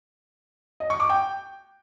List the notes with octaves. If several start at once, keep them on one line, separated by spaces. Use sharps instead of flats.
D#5
C#6
D6
G5